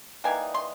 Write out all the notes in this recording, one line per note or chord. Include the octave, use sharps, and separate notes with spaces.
E3 G3 A#3 D#4 G#5
C6